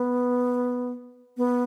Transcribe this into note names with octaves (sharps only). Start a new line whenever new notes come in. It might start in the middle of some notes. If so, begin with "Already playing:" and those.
Already playing: B3
B3